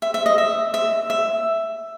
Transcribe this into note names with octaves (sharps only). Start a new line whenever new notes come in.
E5
E5
D#5
E5
E5
E5